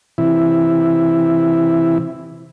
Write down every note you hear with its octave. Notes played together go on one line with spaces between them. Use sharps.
C3 E3 E4